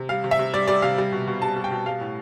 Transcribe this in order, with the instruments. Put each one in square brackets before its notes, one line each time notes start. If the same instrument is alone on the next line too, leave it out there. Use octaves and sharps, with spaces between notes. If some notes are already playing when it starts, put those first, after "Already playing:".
Already playing: [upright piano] C3
G3 F5
C3
E5
C3
G3 D5
G3 D5
C3 F5
G3
B2
B2
G3 A5
G3
G5
B2
G3 F5
A2